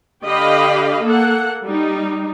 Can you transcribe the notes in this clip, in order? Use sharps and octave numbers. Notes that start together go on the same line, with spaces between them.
D3 G4 D#5 F5 B5
A#3 A4 F#5
G3 D#4